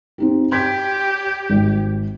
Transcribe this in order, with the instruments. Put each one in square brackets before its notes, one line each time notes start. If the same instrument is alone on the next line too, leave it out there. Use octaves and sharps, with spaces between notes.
[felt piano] C4 D#4 G4
[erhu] G4 [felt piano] C6 G#6 B6
[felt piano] G#1